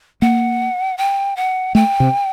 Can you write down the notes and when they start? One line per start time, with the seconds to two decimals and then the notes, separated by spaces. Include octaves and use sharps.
0.22 A#3 F#5
0.98 G5
1.37 F#5
1.75 A3 G5
2.00 C3